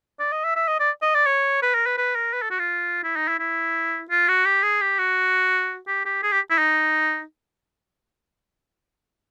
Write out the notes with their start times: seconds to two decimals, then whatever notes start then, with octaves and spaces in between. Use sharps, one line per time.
0.19 D5
0.32 D#5
0.44 E5
0.56 E5
0.68 D#5
0.80 D5
1.02 D#5
1.15 D5
1.26 C#5
1.62 B4
1.74 A#4
1.86 B4
1.98 B4
2.15 A#4
2.33 B4
2.42 A4
2.51 F#4
2.59 F4
3.04 E4
3.16 D#4
3.28 E4
3.39 E4
4.10 F4
4.28 F#4
4.46 G4
4.63 G#4
4.81 G4
4.99 F#4
5.88 G4
6.06 G4
6.23 G#4
6.32 G4
6.50 E4
6.58 D#4